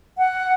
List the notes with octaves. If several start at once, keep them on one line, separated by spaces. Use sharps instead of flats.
F#5